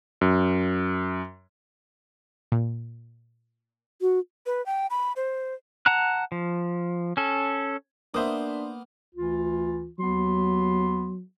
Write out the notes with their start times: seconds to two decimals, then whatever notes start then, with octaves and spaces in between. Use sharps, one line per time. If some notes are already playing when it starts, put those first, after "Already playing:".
0.21 F#2
2.52 A#2
4.01 F#4
4.46 B4
4.66 G5
4.90 B5
5.16 C5
5.86 F#5 A5 A#5 F#6
6.32 F3
7.17 C#4 A4
8.14 A#3 B3 D4 A#4 C5 E5 D#6
9.15 D2 E3 F4
9.99 D#2 F#3 B3 C6